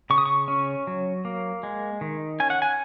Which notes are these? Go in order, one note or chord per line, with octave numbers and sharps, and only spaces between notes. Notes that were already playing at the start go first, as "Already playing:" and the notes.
C#3 C#6
D#6
C#6
C#4
F#3
A#3
G#3
D#3
C#4 G#5
F#5
G#5